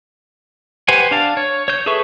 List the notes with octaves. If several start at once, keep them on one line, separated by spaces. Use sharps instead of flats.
G4 B4 C5 F#5 G#5
D4 F5 A5
C#5
C#5 G6
G#4 A4 B4 E5 C#6